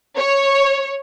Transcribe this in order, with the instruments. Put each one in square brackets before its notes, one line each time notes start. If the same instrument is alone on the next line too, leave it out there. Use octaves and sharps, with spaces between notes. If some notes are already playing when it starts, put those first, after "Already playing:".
[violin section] C#5